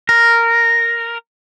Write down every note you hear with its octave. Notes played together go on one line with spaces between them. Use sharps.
A#4